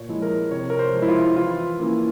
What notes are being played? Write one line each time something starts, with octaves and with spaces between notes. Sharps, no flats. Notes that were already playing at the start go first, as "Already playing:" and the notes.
Already playing: A#2 C#5
F3 G#3 E4
A#4
C3 C#5
A#4
C5
F3 G#3
E4
F4
E3 F4
A#3 C#4 E4